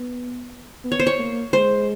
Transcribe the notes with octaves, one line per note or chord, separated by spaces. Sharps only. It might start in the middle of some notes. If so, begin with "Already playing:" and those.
Already playing: B3
B3
C#5
C5
C#5
A#3
G#3 C5